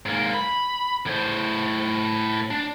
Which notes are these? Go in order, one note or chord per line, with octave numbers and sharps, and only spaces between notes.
G#2 A#3
B5
A2 C5
D4